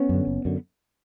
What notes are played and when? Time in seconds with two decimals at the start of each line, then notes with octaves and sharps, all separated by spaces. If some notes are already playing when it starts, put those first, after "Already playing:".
Already playing: B3 C#4
0.09 F#2 D3
0.27 F#1
0.45 F#2 D3